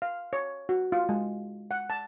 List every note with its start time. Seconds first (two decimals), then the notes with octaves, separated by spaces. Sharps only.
0.02 F5
0.33 C#5
0.69 F#4
0.92 F4
1.09 G#3
1.71 F#5
1.90 A5